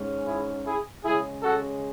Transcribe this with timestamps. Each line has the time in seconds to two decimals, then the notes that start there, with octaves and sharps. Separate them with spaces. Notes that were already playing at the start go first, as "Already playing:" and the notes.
Already playing: G#2 G#3 C#4
0.27 E4 G#4
0.65 E4 G#4
1.04 C#3 G#3 C#4 E4 G#4
1.43 F#4 A4